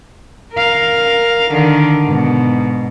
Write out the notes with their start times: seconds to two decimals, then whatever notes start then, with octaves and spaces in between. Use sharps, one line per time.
0.54 A#4 F5
1.50 D3 D#3
2.03 G#2 B2